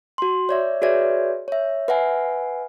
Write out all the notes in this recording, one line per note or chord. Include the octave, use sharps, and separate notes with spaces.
F#4 C6
C#5 D5 E5
F#4 G#4 B4 C#5 D5 E5
C#5 E5
B4 E5 F#5 G#5